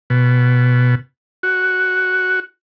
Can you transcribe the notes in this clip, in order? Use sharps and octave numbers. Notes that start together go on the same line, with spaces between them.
B2
F#4